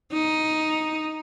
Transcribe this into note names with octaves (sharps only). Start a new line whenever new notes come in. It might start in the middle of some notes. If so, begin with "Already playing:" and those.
D#4